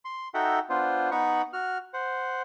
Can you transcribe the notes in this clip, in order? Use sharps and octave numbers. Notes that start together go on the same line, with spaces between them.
C6
D#4 F#4 A4 E5 F#5 G5
B3 D4 F4 C5
B3 D#4 F#5 B5 C#6
F#4 F6
C5 F#5